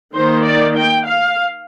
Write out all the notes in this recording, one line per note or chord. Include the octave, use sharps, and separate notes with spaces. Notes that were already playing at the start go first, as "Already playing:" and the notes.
D#3 A#3 D#4 C5
D5
G5
F5